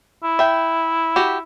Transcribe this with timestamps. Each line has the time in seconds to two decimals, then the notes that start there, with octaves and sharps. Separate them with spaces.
0.23 E4
0.39 E5 G5
1.16 F#4 G4